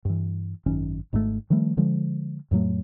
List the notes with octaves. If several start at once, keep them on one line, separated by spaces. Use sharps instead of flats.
G2 E3
G#1 F#2 D#3 C#4
G#1 G#2 C3 A3
D#3 F3 G3 A3
D3 F3 G#3
F2 A2 F#3 A3